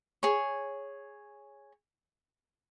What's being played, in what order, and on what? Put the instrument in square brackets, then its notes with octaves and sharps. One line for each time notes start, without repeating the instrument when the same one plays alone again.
[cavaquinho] G#4 C#5